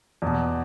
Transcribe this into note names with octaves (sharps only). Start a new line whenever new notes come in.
E2 B2